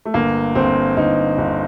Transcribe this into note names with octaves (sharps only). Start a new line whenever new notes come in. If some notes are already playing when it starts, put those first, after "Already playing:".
A3
G1 A#3
G1 C4
G1 D#4
G1